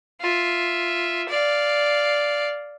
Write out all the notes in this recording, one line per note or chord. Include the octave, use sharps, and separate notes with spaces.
F4 E5
D5 F5